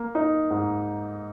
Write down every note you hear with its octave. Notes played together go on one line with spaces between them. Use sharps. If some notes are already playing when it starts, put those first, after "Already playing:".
Already playing: A#3
D#4
G#2